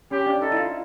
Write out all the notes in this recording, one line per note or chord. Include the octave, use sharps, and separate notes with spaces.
C#4 G4
D4
D#4 A4
E4
F4